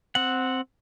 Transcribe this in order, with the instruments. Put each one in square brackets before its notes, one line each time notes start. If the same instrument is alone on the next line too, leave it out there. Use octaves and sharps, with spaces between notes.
[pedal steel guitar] C4 F#5